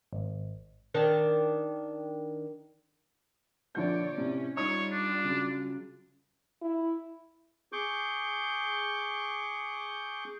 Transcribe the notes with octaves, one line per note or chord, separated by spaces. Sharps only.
G#1
D#3 D4 A#4
A#1 D3 C#5 D5 G6
A2 C3 C#4
G3 D#4 F4 C#5 D#6
D4
C#3 F#3
E4
G#4 C#6 D6 G6